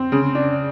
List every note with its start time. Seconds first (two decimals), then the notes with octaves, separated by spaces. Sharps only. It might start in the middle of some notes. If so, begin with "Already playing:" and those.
Already playing: C4
0.12 C#3
0.35 D4